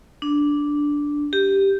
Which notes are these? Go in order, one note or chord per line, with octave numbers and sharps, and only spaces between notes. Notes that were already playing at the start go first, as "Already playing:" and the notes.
D4
G4